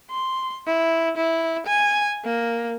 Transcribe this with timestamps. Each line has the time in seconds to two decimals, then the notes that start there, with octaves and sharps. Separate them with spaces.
0.10 C6
0.66 E4
1.17 E4
1.67 G#5
2.25 A#3